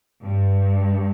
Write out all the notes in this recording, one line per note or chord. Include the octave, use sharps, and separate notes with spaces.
G2